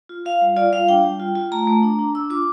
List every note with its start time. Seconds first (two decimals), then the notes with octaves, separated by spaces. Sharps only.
0.09 F4
0.25 F4 F5
0.41 G3
0.56 F4 D5
0.73 G3 F5
0.88 D4 G5
1.05 G3
1.20 F4
1.35 F4
1.52 A3 A#5
1.67 A3
1.83 D4
1.99 D4
2.15 D4 E6
2.30 F4 D6